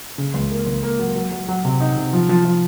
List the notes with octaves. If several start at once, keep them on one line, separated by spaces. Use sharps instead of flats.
C#3
C#2
A#3
C#2
A#3
F#3
F#3
F#3
F#3
C3
D#4
C3
F3
F3
F3